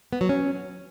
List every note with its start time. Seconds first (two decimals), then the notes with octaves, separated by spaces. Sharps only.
0.13 B3
0.21 F#3
0.29 C#4